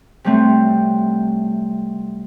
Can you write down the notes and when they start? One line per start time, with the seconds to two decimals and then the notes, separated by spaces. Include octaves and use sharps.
0.24 C3 F#3 G3 A3 C4